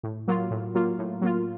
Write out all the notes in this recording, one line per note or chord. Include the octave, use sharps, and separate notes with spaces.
A2
F#3 A#3 F4
A2
F#3 A#3 F4
A2
F#3 A#3 F4